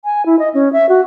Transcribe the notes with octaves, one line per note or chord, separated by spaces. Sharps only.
G#5
E4
D#5
C#4
E5
F#4